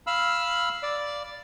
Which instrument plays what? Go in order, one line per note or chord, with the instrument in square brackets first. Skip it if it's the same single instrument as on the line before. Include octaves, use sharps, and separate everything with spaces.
[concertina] F5 B5 E6 F6
D5